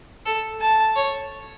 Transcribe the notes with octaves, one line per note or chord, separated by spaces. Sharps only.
A4
A5
C#5